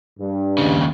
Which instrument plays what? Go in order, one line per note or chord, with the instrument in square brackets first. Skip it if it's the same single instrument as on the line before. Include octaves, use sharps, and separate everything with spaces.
[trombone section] G2
[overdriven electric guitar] D#2 C#3